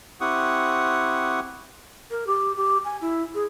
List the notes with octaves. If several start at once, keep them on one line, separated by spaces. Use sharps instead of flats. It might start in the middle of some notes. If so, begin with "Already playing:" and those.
C4 E4 G4 F#5 C#6 D#6
A#4
G4
G4
G#5
E4
G#4